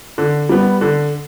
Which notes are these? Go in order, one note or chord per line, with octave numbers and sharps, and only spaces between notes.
D3
G3 B3
D3